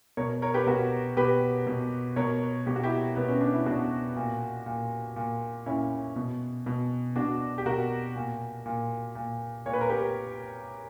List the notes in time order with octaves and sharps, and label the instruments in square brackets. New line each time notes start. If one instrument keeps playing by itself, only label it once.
[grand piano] B2 A#4 C#5
A#4 C#5
G4 B4
B2 F#4 A#4
B2 G4 B4
B2
B2 A#4 C#5
B2 G4
F#4
E4 G4
B2 B3
C#4
D4
E4
B2 D4 F#4
A#2
A#2
A#2
A#2 C#4 E4
B2
B2
B2 D4 F#4
G4
B2 F#4 A#4
A#2
A#2
A#2
A#2 C#5
B4
A#4
G4 B4